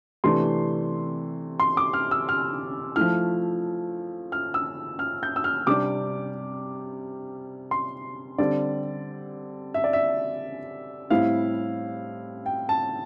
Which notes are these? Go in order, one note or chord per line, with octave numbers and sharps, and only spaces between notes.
C3 E3 A3 D4 C6
C6
D6
F6
E6
F6
F3 A3 E4 F6
F6
E6
F6
G6
E6
F6
C3 G3 D4 D6
C6
D3 G3 C4 D5
E5
D5
E5
A2 G3 C4 E4 F5
G5
A5